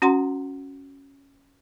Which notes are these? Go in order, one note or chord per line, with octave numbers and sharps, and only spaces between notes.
C#4 F#4 F#5 A#5 C6